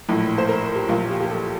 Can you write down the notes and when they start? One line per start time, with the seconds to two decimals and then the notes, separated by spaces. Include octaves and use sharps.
0.09 A#1 A2
0.38 C5
0.49 A#4
0.76 G4
0.89 A#1 A#2 F4
1.09 G4
1.20 G4
1.29 A4